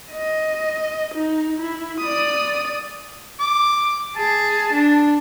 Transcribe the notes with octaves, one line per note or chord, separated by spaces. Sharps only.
D#5
D#4
E4
D5 D#6
D6
G#4 A5
D4